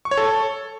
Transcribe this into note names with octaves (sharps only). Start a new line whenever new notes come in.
C#6
C#5
A4